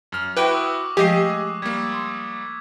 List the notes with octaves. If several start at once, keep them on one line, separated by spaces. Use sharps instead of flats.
F#2 F6
E4 F#4 B4 G5 C#6 D6
D#6 E6 F#6
F3 G#3 A3 G4 G#4 D#5 C7
G3 A#3 G#6 B6
C6